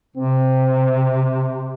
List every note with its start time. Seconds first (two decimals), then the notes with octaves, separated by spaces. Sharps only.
0.16 C3 C4